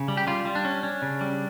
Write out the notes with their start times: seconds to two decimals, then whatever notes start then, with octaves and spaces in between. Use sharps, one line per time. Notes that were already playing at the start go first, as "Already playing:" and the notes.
Already playing: C#3
0.08 G3
0.17 G4
0.27 G3 F4
0.45 G3
0.55 D4
0.65 C#4
0.83 C#4
1.02 C#3
1.21 G3